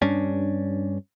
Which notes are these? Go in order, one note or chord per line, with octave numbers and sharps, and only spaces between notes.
G2 C#4 D4